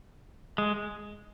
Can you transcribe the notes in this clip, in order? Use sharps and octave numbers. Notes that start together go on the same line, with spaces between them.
G#3